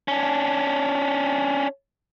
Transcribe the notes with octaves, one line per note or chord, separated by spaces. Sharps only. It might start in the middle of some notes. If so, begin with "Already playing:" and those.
C#4 D4